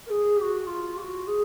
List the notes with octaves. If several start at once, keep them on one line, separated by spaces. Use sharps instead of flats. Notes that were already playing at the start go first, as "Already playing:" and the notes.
A#4
G#4
G4
F#4
F4
G4
F#4
G#4